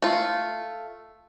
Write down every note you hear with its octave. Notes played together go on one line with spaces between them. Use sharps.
A3 F4